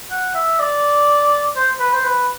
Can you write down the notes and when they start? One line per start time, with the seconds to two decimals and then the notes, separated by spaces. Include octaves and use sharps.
0.11 F#5
0.35 E5
0.59 D5
1.56 C5
1.79 B4
1.93 C5
2.05 B4